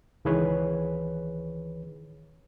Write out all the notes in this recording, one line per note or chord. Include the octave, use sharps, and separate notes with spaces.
C#2 D#3 E3 G#4 B4 C#5